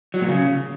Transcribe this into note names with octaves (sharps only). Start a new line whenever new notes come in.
F#3
A#2
C#3